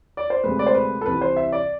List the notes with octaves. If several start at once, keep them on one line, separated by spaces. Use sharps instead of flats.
D5
C5
D2 C3 G#3 B4
D5
C5
B4
A4
C2 C3 E3 B4
C5
E5
D5